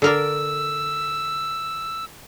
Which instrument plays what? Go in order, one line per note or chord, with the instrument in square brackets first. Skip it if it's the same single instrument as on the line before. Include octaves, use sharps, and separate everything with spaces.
[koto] D3 A#4 D5 [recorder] E6